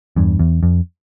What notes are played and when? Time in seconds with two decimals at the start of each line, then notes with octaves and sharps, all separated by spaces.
0.16 E2 G2
0.39 E2
0.63 F2